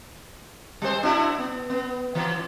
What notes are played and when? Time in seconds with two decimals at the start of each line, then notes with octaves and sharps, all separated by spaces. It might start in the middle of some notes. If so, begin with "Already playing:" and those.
0.82 G3 C5
1.03 D4 E4 F#4
1.38 B3
1.70 B3
2.15 E3